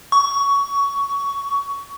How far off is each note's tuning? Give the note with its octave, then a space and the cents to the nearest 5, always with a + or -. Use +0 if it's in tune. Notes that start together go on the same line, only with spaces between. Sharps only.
C#6 +20